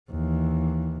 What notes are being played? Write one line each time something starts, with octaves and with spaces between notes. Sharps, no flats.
D#2 E3